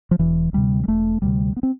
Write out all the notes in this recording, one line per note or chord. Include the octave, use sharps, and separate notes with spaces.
F3
E1 E3
D2 C3 G3
G3
E1 A3
D2 C3 G3
B3
C4